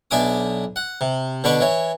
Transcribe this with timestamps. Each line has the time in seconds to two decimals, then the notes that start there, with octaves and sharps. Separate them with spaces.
0.11 B1 D4 E5 G#5 D6 D#6
0.76 F#5
1.01 C3
1.44 B2 D3 D4 B5 C#6 D6
1.61 E3 C#5